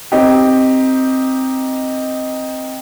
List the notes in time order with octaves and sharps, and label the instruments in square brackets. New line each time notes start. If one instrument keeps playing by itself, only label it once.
[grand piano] C4 D#4 G4